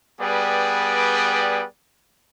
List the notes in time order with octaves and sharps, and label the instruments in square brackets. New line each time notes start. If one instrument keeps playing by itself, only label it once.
[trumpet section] G3 B3 G#4 B4 D5 G5